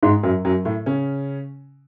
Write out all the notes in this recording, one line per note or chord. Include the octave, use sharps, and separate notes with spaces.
G#2 G#3
F#2 F#3
F#2 F#3
A2 A3
C#3 C#4